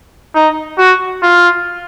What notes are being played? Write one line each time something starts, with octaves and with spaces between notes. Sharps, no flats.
D#4
F#4
F4